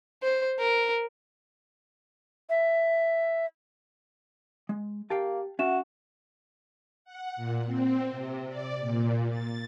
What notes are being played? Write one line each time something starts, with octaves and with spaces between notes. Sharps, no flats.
C5
A#4
E5
G#3
A#3 G4 F5 G5 A5
C#4 F#4 E5 F#5 E7
F#5
A#2
C4
C3
D5
A#2
A6